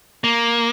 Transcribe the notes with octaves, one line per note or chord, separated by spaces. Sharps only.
A#3